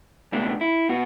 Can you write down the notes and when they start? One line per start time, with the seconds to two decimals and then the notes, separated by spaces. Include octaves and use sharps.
0.32 C#2 B2 A3 D4
0.61 E4
0.89 B2 F#4